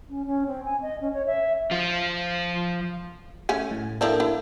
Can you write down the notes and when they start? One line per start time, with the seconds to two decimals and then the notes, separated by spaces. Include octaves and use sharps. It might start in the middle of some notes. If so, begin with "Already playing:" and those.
0.09 C#4
0.26 C#4
0.47 C4
0.65 G#5
0.82 D#5
1.01 C#4
1.13 C#5
1.26 E5
1.71 F3 F4
3.49 A3 C#4 G#5
3.71 A2
4.01 F3 A#3 C4 D4 E4 A4
4.20 E4